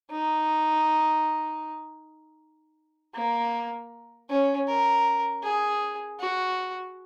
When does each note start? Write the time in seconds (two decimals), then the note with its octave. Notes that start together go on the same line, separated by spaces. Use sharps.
0.11 D#4
3.15 A#3
4.29 C#4
4.68 A#4
5.43 G#4
6.20 F#4